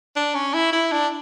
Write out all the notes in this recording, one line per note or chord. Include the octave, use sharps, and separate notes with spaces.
D4
C#4
E4
E4
D4